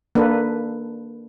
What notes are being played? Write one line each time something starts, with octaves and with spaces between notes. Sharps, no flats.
A#3 D4 A4 B4